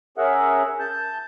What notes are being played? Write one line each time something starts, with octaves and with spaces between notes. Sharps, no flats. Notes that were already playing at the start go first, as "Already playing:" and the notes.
C#4 G#4 A#4 E5 F#5
A5 G6